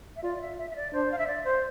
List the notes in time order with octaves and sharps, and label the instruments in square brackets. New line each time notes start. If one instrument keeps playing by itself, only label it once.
[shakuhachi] E5
[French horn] F4 [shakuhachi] D5
[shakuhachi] D5
E5
E5
E5
D5
[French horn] D4 [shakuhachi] C5
[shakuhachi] F5
E5
D5
C5